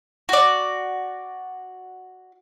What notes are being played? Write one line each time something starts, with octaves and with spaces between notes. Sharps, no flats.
F#4 D5